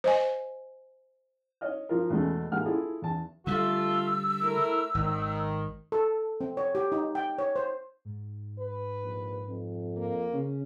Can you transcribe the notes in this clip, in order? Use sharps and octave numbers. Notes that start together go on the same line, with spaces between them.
C5 D#5 G#5
C#5 D#5 F6
F3 F4 A#4
E2 B2 G#3 A3
A1 G#3 A#3 F#5 F6
E4 F4 G#4 A4
E2 A5
D3 G3 A3 F4 E6
A3 E4 A#4
G#1 D#3
A4
C4
C#5
G4
D#4
G5
C#5
C5
G#2
B4
A#1
F2
A#3
C#3 C#4